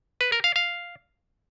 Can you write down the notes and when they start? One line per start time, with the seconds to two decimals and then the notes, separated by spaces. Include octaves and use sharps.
0.21 B4
0.32 A#4
0.44 F5
0.56 F5